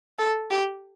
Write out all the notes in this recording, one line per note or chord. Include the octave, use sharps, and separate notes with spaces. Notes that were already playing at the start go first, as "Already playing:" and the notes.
A4
G4